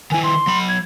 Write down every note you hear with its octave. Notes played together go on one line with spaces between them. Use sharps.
D#3 E4 G#5
C6
F#3 B5
G#6